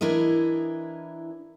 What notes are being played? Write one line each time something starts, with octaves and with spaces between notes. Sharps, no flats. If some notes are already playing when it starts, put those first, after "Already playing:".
E3 D4 E4 A#4 D#5